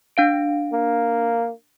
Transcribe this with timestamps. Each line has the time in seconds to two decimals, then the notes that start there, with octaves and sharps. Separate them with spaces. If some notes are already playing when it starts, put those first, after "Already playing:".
0.17 D4 F5 D7
0.73 A#3